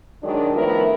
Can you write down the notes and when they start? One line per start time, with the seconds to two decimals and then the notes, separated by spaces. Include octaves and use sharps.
0.23 D#3 F#3 G#3 D4
0.55 A2 D#3 F3 B3 E4 A#4